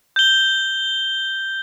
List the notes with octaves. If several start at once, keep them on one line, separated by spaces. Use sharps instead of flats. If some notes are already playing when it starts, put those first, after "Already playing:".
G6 G7